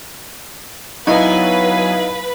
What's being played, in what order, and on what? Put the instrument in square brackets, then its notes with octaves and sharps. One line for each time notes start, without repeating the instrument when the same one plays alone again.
[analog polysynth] F#3 B3 G#5 [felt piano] D#4 E4 D#5 [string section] B4 [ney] F5